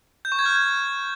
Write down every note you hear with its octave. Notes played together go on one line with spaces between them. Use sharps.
G6
C#6
G#6
F6